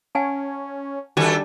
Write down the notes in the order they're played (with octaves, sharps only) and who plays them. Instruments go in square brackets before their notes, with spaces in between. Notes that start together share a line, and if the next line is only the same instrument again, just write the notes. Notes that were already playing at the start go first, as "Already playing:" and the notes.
[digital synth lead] C#4 [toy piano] F#5 G#5 A5
[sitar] D#3 A4 [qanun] G3 D4 G#5 [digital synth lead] F#4